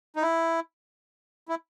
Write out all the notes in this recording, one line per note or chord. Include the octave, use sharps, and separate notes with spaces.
D#4
E4
E4